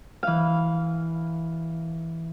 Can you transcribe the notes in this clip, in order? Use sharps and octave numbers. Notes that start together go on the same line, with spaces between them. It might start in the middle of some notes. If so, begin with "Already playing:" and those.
E3 F5